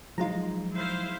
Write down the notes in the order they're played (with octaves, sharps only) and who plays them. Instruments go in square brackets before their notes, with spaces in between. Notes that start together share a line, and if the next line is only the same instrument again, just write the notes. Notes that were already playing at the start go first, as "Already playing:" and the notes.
[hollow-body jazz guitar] F3 G#3 D#4 [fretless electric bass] F#3 [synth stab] F4 A#5
[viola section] E4 C5 F5